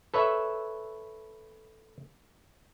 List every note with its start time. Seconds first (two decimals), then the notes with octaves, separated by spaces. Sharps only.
0.14 A4 B4 C#5 E5